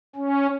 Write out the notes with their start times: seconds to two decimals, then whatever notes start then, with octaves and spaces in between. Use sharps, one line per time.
0.16 C#4